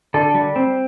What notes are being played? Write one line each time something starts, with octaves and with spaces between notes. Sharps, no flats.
D3 A4
G3
C4